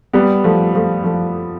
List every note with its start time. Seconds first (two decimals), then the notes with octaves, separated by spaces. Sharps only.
0.13 G3 B3
0.44 F3 A3
0.75 F3 A3
1.04 F3 A3